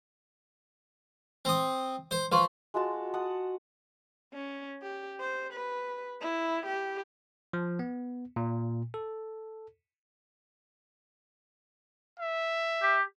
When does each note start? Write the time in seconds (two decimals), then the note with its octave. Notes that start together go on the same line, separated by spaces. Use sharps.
1.45 C4 D#6
2.11 C5
2.32 F3 B4 C6 C#6
2.74 G#3 F4 F#4 A5
3.14 F#5 A5 D#6
4.33 C#4
4.82 G4
5.20 C5
5.53 B4
6.21 E4
6.66 G4
7.53 F3
7.79 B3
8.36 A#2
8.94 A4
12.19 E5
12.82 G4